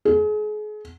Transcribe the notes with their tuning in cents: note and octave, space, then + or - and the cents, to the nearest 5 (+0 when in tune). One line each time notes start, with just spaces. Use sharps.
G#4 +35